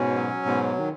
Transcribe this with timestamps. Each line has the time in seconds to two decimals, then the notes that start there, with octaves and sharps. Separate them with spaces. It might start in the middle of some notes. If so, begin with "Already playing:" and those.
Already playing: G#2 B2 C#4
0.15 F#3
0.46 G#2 B2
0.79 D#3